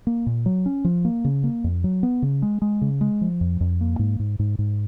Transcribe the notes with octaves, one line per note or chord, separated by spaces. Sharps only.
A#3
A#2
F#3
C#4
F3
A#3
C#3
A#3
F2
F#3
B3
C#3
G#3
G#3
C#3
G#3
F3
F2
F2
A#3
G#2
G#2
G#2
G#2